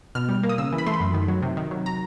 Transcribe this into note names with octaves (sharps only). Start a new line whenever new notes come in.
B2 F6
G3
A#3
D#6
C#3 E6
E3
B5
A3 C6
B5
F#2
D#3
F#3
C3
D#3
F#3
A#5